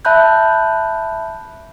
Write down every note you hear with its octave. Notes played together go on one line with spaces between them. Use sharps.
E5 A5 B5 F#6 G6